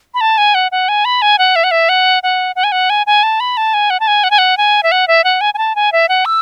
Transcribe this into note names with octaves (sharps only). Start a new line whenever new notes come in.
B5
A5
G#5
F#5
F#5
G#5
B5
G#5
F#5
E5
F#5
E5
F#5
F#5
F#5
G#5
F#5
G#5
G#5
A5
B5
A5
G#5
F#5
A5
G#5
F#5
G#5
F#5
G#5
E5
F#5
E5
F#5
G#5
G#5
A5
G#5
E5
F#5
E6